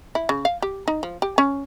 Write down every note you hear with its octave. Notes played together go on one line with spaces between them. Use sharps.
E4
C#3
F5
G4
D#4
F3
G4
C#4